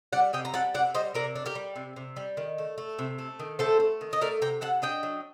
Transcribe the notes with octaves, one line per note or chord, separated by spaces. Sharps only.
G3 D5 F#5
C3 D#5 G5
A#5
G3 F#5 A5
C3 D5 F#5
G3 C5 D#5
C3 A#4 D5
D4
G4 A#4
G3
C3
C3
G3
D#3
A3
A3
C3
A3
D#3
A3 A4 C5
A3
D#3
D#5
A3 A#4 D5
C3 G5 A#5
C3 F#5 A5
D4 D#5 G5
F#3